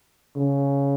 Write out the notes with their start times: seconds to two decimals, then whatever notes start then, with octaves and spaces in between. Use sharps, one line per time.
0.36 C#3